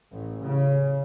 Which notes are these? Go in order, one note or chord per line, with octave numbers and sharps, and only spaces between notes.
A1
C#3